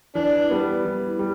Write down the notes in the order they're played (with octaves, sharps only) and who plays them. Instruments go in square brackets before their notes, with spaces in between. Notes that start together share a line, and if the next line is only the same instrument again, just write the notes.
[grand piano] E3 [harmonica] D4
[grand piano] G3 B3
E3
G3